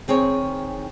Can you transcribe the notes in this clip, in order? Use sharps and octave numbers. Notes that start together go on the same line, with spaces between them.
D#3 C4 G#4 C#5